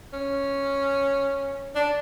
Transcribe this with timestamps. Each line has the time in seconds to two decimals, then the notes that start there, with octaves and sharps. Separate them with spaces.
0.13 C#4
1.75 D4